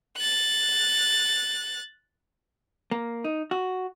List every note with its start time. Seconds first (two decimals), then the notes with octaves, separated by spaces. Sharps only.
0.17 F#6 A6
2.91 A#3
3.24 D#4
3.51 F#4